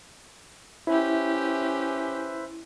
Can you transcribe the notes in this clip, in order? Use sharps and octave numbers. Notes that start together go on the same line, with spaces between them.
C#4 E4 G4 B4 C5 E5